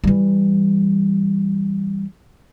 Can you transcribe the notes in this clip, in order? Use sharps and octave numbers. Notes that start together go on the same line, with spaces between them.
E3 G3